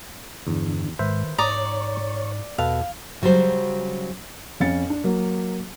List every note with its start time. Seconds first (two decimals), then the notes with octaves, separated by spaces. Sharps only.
0.47 E2 G2 D3
0.99 G#2 D#3 B4 C5 E5
1.38 G#2 C#5 D5 A#5 D#6
2.58 E2 B2 A4 B4 F5
3.22 C#3 F#3 G3 F#4 C5
4.60 F2 C#4 F5 A6 C#7
4.90 D4
5.04 F#3 A#3